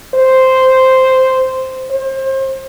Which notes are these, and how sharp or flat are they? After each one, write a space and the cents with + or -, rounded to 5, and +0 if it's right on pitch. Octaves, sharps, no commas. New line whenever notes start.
C5 -5
C5 +30